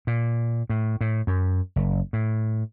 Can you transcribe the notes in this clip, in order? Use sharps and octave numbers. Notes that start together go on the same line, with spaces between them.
A#2
A2
A2
F#2
F#1
A2